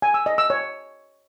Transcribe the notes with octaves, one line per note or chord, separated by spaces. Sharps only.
G#5
E6
D#5
E6
C#5